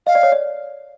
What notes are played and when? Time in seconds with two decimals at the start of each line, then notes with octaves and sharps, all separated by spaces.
0.07 D#5 F5
0.15 D5
0.23 C#5
0.32 D5